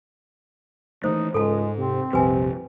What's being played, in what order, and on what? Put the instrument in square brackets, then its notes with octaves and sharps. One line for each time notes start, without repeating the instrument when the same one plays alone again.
[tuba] D#2 [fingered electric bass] E3 F#3 A3 [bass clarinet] D#4 [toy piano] C5
[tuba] C#2 [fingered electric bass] G#2 [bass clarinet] G#3 [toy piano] A4 A5
[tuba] C3 [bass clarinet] C4
[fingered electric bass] A#1 F2 G3 [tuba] C3 [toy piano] B4 G#5